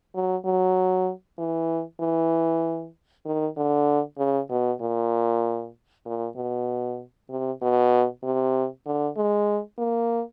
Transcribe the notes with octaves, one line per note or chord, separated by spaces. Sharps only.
F#3
F#3
E3
E3
D#3
D3
C#3
B2
A#2
A#2
B2
C3
B2
C3
D3
G#3
A#3